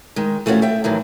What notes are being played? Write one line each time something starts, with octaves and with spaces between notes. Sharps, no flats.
D#3 G#3
E3 A3 C4 C#4 F4 F#4
E5 G5
A2 D#3 E3 F#3